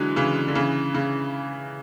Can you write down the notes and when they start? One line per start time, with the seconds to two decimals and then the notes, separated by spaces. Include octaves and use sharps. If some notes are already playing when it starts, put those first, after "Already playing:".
Already playing: D3 E3 F#3 G#3
0.16 C#3 E3
0.48 D3
0.55 C#3 E3
0.95 C#3